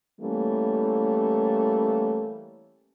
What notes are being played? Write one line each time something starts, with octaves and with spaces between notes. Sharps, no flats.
E3 G3 A3 A#3 C#4